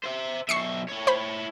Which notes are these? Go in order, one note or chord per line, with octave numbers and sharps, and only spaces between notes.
C5 E5
B1 E5 C#6 C7 C#7
E4 C#5
C5 B5